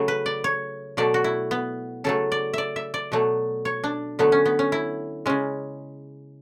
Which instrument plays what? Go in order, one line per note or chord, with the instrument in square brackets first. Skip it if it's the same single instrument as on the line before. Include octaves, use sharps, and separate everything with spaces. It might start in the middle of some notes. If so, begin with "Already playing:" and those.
Already playing: [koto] C#3 F#3 A3
B4
D5
C#5
B2 F#3 A3 D5
F#4
E4
B3
C#3 F#3 A3 A4
D5
D5 E5
E5
D5
B2 F#3 A3
C#5
D4
D3 F#3 A3 B3
C#4
B3
C#4
E4
C#3 G#3 C#4